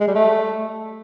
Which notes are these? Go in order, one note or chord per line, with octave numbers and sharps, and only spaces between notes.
G#3
G3
A3